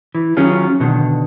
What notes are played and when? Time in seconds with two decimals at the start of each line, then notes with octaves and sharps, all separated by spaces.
0.15 E3
0.37 D#3 F#3 C#4 F4 G#4
0.80 B2 D3 D#3